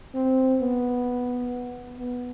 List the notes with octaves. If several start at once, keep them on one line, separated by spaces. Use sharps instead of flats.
C4
B3
B3